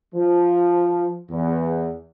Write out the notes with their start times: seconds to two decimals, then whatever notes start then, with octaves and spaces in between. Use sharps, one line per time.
0.14 F3
1.31 E2